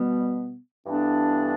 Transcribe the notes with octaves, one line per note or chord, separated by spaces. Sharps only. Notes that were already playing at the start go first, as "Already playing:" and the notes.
Already playing: B2 G3 B3
G2 E3 B3 D4 A4